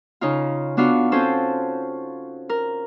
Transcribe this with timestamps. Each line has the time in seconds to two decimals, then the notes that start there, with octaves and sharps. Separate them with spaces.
0.21 C#3 D#4 F4
0.77 B3 D4 F4 F#4 F5
1.12 C4 C#4 F4 A4 C5 A5
2.49 A#4